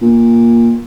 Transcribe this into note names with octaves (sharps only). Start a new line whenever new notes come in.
A#2